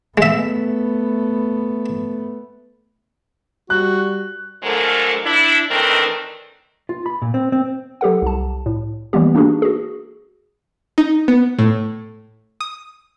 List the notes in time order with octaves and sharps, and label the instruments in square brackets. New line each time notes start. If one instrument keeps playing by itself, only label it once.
[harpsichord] G#3 E5 [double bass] A3 B3
[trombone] G3 [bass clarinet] F#4 [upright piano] F#6
[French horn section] D3 F3 F#3 G#3 A3 A#4
D4 E4
D#3 E3 A3 C4 D4 A#4
[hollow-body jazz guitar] F4
B5
A#2
C4
C4
[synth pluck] F#3 G4 A4 F#5
C2 A5
A2
E3 G3 G#3 A#3 B3 G4
A#3 D4 D#4 F#4 G#4
F#4 G#4
D#4
B3
A2
D#6